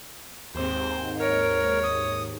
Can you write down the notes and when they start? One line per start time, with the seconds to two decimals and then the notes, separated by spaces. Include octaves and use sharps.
0.55 D#2 G#2 C4 C5
1.19 A#4 C#5
1.83 D#6